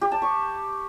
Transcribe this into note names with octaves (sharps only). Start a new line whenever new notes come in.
G4
A5
C#6